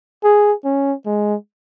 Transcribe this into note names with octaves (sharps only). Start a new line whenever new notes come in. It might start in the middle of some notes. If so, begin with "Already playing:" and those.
G#4
C#4
G#3